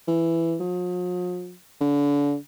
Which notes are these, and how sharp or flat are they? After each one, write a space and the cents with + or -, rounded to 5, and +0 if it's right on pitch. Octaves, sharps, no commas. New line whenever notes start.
E3 +10
F3 +45
D3 -35